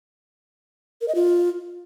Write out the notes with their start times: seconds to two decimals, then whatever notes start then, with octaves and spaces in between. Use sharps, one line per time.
1.01 A#4
1.08 D#5
1.15 F4